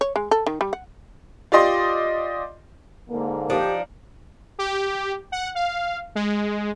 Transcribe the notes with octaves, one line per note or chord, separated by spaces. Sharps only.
C#5
G#3
A4
D#3
G3
F#5
F4 G4 D5 D#5 C6
G#2 D3 A#3
F3 D4 D#4 G4
G4
F#5
F5
G#3